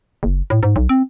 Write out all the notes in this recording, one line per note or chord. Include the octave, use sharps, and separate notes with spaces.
F#1
A2
G#2
B1
C4